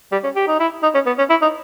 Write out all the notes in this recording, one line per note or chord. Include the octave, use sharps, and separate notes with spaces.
G3
C#4
G4
D#4
E4
D#4
C#4
B3
C#4
E4
D#4